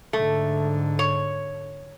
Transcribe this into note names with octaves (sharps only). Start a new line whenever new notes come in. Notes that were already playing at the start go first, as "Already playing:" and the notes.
G#2 D3 A3
C#5